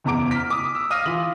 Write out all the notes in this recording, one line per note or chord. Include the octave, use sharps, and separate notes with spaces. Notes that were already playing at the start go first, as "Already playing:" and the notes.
F#1 E2 A#5 D6 D7
F6 B6
D6 D#6
E6
F5 D#6 F6 A#6 D#7
E3 F4 B6 F#7